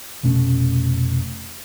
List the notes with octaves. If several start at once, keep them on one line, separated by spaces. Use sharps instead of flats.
F1 B2 A3 C#4